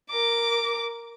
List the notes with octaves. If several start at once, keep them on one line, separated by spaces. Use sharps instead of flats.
A#4 D6